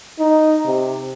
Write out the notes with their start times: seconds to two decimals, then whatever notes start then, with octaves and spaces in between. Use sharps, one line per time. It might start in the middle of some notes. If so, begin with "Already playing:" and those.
0.20 D#4
0.66 C3